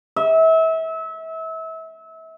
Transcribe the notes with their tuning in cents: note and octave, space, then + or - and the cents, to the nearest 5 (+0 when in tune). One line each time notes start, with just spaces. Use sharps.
E5 -30